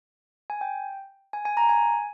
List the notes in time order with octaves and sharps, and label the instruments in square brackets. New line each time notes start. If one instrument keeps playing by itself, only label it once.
[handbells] G#5
G5
G#5
G#5
A#5
G#5